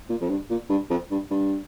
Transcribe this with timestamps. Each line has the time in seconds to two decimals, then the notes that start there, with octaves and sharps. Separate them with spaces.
0.10 A#2
0.21 F2
0.29 G2
0.50 A#2
0.69 G2
0.90 F2
1.11 G2
1.31 G2